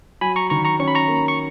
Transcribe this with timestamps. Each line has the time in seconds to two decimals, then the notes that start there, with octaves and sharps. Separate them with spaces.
0.21 F#3 G#5 B5
0.36 A#5 C#6
0.50 D#3 A#5 C#6
0.65 A#5 C#6
0.79 C#4 C#6
0.88 B5
0.95 A#5 C#6
1.08 A#3
1.28 C#6